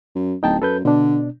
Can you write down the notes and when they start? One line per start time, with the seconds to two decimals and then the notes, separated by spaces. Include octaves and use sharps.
0.16 F#2
0.43 D1 D#4 G5 A5
0.62 F#2 A4 B4 G6
0.85 B2 D3 D4